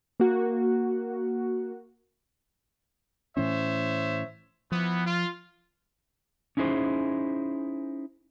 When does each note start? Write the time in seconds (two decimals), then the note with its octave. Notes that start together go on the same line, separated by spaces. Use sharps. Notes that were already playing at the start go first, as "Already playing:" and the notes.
0.20 A#3 F#4
3.37 A2 E3 C#4 C5 C#5 E5
4.72 E3 F3 B3
5.06 F4
6.57 C#4 D#4 E4 G#4 C5